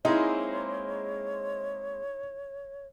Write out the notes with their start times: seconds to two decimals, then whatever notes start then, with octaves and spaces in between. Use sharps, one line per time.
0.05 G#3 A#3 C4 D#4 E4 C#5